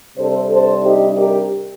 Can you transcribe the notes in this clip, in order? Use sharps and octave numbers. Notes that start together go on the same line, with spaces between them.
C3 G3 D4 A4 C5
A4 C5
D#4 G4
G4 A#4